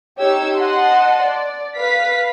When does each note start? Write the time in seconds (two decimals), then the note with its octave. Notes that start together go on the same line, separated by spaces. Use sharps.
0.19 D#4 G4 C#5 E6 G#6
0.58 D#5 F#5 A5 C6
1.23 D5
1.76 B4 F5 B6